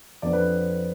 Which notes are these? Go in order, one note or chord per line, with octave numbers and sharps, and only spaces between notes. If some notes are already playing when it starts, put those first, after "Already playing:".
F2 D3 F3 B3 D4 D5
B4